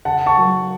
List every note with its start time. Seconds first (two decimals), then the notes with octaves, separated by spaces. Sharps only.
0.05 C#3 F#5 A5
0.26 A5 C#6
0.37 F#3